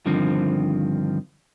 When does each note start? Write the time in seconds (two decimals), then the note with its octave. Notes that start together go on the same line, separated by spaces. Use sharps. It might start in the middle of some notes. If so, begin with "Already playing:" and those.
0.06 G2 D3 D#3 F3 C4